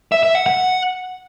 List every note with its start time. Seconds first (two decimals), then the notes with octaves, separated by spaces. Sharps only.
0.12 E5
0.23 E5
0.35 F#5
0.46 F#5